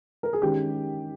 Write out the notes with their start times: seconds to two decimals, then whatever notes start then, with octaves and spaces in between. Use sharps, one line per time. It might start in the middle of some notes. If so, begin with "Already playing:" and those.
0.23 A#4
0.33 G#4
0.42 D#3 G#3 C#4 G4